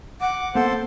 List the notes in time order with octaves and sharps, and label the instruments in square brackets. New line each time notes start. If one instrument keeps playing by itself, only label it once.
[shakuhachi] F#5 [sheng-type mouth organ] D6
[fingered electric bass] A#3 B3 [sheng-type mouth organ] A4 C5